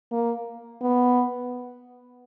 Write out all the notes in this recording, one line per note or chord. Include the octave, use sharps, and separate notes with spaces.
A#3
B3